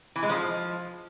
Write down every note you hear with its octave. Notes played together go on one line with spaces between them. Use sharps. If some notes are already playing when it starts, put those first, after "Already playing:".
E3
G#3
F3